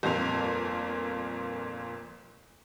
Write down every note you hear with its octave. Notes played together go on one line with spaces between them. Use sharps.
G1 F2 A#2 F7